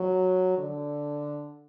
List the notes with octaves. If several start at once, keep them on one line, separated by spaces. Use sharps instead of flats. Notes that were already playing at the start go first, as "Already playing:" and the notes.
Already playing: F#3
D3